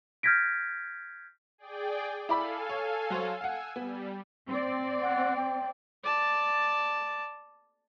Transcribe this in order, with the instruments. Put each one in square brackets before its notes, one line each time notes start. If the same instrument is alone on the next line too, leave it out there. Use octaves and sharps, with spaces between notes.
[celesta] F6 G6 G#6 A#6 B6 D7
[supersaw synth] G#4 D5 G5
[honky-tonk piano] E4 D5 B5 [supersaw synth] A4 F5 G#5
[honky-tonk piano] C#5
F#3 C5 C#5
[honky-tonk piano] F5 F#5 [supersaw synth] G#5 E6
[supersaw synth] G3 [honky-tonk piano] B3
[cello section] C4 D5
[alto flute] F#5
G5
[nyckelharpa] D5 A5